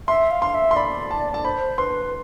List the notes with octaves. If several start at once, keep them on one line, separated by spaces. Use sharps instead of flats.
E5 C6
F5
C6
E5
C6
D5 B5
A5
A5
C5 B5
B4 C6